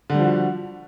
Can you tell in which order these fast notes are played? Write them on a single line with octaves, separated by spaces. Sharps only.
D3 G3 F3 F#4